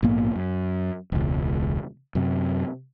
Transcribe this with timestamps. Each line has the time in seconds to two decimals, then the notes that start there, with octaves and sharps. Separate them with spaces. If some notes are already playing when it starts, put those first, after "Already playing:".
0.03 A#1 G#2 A#3 B3
0.36 F#2
1.12 E1 C#2
2.15 F#2 C3